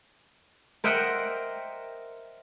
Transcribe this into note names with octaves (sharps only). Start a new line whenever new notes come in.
A#4 C5 D#5 E5 F#5 G5